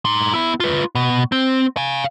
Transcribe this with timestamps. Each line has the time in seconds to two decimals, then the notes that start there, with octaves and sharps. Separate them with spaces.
0.05 D#4 C6
0.34 B3 E4
0.60 F4 B4
0.95 B2
1.32 C4
1.77 F5 G#5